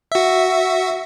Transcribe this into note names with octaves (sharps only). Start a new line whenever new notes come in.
F#4 E5